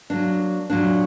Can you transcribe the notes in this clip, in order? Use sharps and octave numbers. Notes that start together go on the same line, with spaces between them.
F#3 A#3 D4
A#2 F#3 A#3 D4